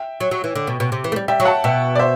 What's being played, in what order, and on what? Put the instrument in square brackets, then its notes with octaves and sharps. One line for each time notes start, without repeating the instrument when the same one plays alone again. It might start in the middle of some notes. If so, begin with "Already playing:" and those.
Already playing: [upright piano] E5 G5
[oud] F#3
F#3
E3
D3
B2
B2
C3
E3
A3
G3
[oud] G3 [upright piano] E5 G5
[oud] F#3
[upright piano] F#5 A5
[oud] B2 [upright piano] E5 G5
[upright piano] D5
C5 E5